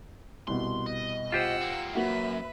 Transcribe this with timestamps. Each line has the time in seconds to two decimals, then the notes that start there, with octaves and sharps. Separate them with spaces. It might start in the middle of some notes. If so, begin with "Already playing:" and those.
0.48 C2 B2 C6
0.87 D#5
1.32 F4 G4 C5 F#5 E6
1.61 A#3 C4
1.95 F#2 A#3 F#4 B4 E5